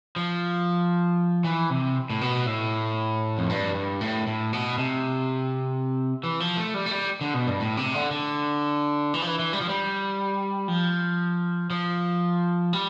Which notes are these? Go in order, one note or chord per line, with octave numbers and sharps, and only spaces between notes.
F3
E3
C3
A2
B2
A2
F2
G2
G2
A2
A2
B2
C3
E3
F3
A3
G3
A3
G3
D3
B2
G2
A2
C3
D3
D3
E3
F3
E3
E3
G3
F3
G3
F3
F3
G3